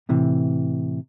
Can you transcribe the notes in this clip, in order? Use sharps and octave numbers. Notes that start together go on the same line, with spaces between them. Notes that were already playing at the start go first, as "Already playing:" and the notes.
A2 C3 E3